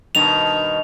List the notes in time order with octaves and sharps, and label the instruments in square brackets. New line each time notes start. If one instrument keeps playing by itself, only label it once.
[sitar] G2 B2 D#3 [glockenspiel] F7